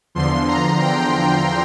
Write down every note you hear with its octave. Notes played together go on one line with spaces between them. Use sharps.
E2 D3 F3 C6
A#5
G5